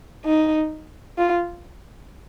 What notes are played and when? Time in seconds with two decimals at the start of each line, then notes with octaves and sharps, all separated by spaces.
0.25 D#4
1.18 F4